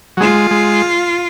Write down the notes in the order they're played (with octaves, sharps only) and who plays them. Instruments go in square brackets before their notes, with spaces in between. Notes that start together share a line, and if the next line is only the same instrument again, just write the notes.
[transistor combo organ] F#3
[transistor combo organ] G#3 [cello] F4
[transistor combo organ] G#3